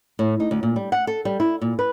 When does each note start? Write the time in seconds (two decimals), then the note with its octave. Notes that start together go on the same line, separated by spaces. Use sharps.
0.19 A2
0.40 D#4
0.51 D2
0.63 A#2
0.76 G3
0.92 F#5
1.07 A4
1.25 G3
1.40 E4
1.61 A#2
1.79 B4